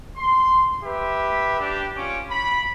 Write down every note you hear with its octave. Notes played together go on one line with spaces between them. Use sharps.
C6
G4 B4 E5
D4 G4
C#4 F4 D6
B5